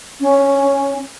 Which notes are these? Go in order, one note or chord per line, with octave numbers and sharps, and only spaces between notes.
C#4